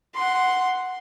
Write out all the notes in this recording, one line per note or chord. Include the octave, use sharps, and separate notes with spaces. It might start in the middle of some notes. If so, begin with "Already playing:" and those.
F#5 C6